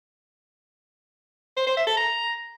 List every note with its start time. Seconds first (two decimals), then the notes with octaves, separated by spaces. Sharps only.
1.57 C5
1.67 C5
1.77 E5
1.87 A4
1.97 A#5